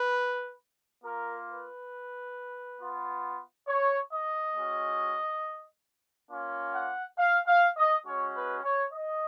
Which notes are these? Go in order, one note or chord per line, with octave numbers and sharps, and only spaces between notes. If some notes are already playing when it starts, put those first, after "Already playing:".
Already playing: B4
A#3 F4 A#4
B4
B3 F4
C#5
D#5
G#3 C#4 F#4
A#3 C#4 F4
F#5
F5
F5
D#5
G#3 C#4 F#4 C#5
B4
C#5
D#5